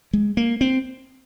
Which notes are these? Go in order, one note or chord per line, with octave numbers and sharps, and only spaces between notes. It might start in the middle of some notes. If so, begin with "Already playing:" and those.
G#3
A#3
C4